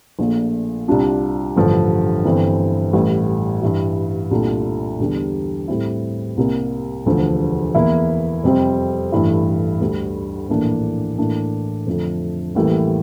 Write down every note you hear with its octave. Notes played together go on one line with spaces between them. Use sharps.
A#1 A#2 A3
C2 C3 G3 D4 F4
A1 G2 D3 F3
G1 G2 E3 A3 C4
A1 A2 G3
G2 E3 G3
C2 A#2 A3 D4 F4
E2 D3 G3 D4
A2 G3 C4 E4
C2 C3 G3 A#3
E1 D2 D3 F3
E2 E3 A#3 E4
F2 C3 G3 C4
A1 G2 E3 A3 E4
D2 D3 G3
A#1 A2 E3 A#3 D4
A2 E3 A#3 D4
F2 D3 F3 A3
A1 A2 E3 G3 A#3